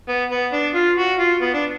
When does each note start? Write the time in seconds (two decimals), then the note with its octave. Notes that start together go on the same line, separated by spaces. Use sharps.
0.09 B3
0.31 B3
0.52 D4
0.75 F4
0.97 F#4
1.20 F4
1.41 B3
1.54 D4